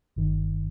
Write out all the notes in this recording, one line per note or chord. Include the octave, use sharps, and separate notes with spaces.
G1 G2 D#3